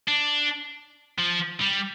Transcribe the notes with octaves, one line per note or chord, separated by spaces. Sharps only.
D4
F3
G3